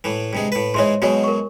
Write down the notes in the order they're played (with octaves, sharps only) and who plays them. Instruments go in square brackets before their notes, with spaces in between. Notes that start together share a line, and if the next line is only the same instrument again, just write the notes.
[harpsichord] A2 E3
G2 C3 G#3
A2 B4
[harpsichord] G#2 E3 G#3 [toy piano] C#5 E5 C6
[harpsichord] B2 F#3 G#3 [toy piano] F#4 C#5 G#5
[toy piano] A#4 C#6